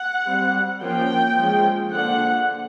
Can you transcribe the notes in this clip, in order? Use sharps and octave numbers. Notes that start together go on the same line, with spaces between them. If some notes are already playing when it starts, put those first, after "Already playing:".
Already playing: F#5
G3 C4
F3 A#3 C#4 G5
F3 G#3 C#4
D3 F3 A#3 D4 F#5